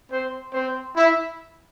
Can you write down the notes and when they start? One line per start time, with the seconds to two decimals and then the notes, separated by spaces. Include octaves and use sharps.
0.11 C4 C5
0.53 C4 C5
0.95 E4 E5